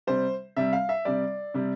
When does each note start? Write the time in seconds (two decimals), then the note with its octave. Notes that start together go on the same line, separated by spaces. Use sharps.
0.07 C3 G3 C5
0.57 C3 G3 E5
0.73 F5
0.89 E5
1.05 C3 G3 D5
1.54 C3 G3